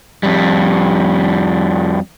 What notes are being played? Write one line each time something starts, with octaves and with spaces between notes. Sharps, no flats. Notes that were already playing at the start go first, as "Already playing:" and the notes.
F2 G3